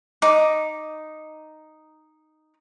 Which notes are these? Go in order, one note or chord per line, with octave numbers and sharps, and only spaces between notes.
D#4 D6